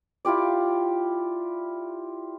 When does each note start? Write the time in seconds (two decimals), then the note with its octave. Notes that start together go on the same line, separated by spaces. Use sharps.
0.25 E4 F4 G4 D5